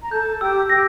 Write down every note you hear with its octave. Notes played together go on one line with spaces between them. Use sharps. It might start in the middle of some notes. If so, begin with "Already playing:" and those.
A#5
A4 A5 G6
G4 G5 E6
G4 G5 A#6